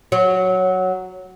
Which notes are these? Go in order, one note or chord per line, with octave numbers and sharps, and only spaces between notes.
F#3